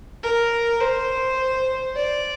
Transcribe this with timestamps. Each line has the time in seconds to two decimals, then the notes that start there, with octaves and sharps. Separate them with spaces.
0.23 A#4
0.80 C5
1.96 D5